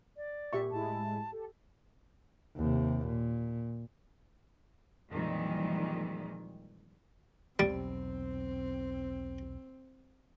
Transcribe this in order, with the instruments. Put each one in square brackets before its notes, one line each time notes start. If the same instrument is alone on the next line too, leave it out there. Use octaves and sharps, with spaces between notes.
[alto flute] D5
[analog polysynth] A#2 [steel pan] G4 E5 C#6
[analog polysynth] A2 G#3 E4 [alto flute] A5
[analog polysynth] G4 A4
[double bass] D#2 C3
A#2
[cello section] F2 A#2 D#3 E3 G3 G#3
[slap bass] B1 E2 [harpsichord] G3 [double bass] C4